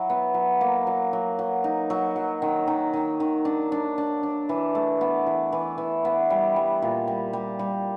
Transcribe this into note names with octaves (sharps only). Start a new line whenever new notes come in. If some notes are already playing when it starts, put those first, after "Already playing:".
Already playing: F#3 E4
B3
F#3
A#3
F#3
F#3
F#3
D#4
F#3
F#3
D#3
D#3
D#3
D#3
D4
D4
D4
D4
E3
A3
B3
E3
E3
E3
B3
G3
G3
A#2
G3
G3
G3